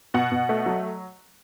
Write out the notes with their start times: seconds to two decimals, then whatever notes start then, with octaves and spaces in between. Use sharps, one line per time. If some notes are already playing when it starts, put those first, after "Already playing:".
0.14 B2 F#5
0.32 B2
0.49 A3
0.66 F#3